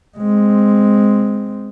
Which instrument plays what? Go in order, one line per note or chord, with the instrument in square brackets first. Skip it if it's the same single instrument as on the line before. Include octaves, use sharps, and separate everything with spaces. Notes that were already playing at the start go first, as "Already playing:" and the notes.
[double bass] G#3 C4